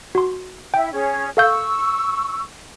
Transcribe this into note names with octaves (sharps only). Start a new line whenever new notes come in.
F#4 C6
E4 E5 G5
C#4 G#4 C#5
A4 F5 C#6 E6 G6